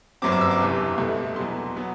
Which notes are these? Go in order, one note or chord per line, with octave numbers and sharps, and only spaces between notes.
G1 F#2 F#3 C4 D6
D6
E6
D6
F#1 E2 C3
C2 B2 A3
E2 B2 F#3 C6
F#3 B3